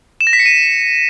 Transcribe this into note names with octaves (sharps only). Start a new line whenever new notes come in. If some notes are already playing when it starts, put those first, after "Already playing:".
E7
A#6
B6
C#7
D#7